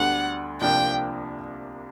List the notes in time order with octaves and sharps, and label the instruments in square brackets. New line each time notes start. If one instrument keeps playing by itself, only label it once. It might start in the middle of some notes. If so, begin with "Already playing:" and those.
Already playing: [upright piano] D2 D3 G3 B3 D4 [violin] F#5
[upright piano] C2 C3 F3 A#3 D4 [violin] G5